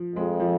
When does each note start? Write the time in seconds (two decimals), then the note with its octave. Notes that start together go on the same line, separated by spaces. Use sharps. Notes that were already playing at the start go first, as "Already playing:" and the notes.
Already playing: F3
0.16 F2 G#3
0.40 F3